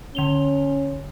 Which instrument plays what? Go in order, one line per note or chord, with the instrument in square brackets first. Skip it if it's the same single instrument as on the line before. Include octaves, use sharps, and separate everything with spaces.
[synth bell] D3 F7 G7 [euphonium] C#4